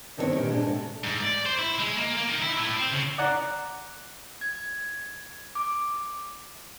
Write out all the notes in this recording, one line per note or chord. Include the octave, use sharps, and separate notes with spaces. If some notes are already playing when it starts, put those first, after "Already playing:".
G2 D#3 B3 C4 A#4 C#5
A#2 D3 D#3 G4
G#2 G#3 D4
C3 A4
G#2
D5
C5
E4
G#3
A#3
A#3
D#3
E4
A2
C4
C#3
D5 F#5 A#5
G#6
D6